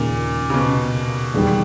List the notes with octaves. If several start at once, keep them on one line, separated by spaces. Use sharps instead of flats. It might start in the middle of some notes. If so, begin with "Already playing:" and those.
Already playing: D#2 A#2 C#3 G#3 D#4
C#3
B2
E2 D#3 G3